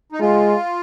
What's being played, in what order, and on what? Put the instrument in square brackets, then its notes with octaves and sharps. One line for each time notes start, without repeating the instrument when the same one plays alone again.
[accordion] D#4
[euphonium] G#3 [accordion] F4